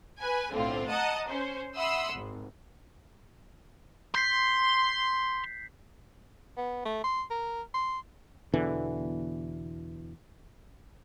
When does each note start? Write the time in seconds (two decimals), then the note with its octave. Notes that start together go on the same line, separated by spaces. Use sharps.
0.20 B4 G#5
0.51 B1 A2 D3 C4 F4
0.89 D#5 F#5 A5 A#5 D#6
1.28 C#4 C5
1.76 E5 F#5 B5 C6 D#6 E6
2.12 G#1
4.15 C6 G6 B6 C7
6.57 B3
6.85 A3
7.04 C6
7.30 A#4
7.74 C6
8.53 E2 B2 D3 E3